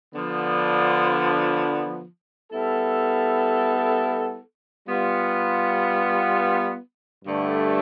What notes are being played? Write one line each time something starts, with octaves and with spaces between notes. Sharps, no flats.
D3 F3 B3
G3 B3 E4 A4
G3 B3 F4
G2 D3 A3